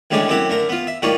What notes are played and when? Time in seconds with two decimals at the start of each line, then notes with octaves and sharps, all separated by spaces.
0.11 D2 A2 G3 G#3 C#4 D4
0.28 F#2 C4 E4 G4 F#5
0.50 D3 A3 A#4
0.69 B3 F4
0.87 E5
1.02 A2 G3 A#3 D#4 F4 C#6